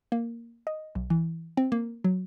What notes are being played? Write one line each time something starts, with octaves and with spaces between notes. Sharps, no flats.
A#3
D#5
B1
E3
C4
A#3
F#3